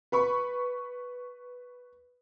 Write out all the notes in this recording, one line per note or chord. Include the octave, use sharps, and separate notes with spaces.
B4 B5 C#6